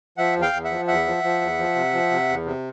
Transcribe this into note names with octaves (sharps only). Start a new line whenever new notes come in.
F3 E5 F#5
E2
F5 G5
E2
E5 F#5
F3
E2 E5 F#5
F3
F3
E2
F3
C3
F3
C3
E2
C3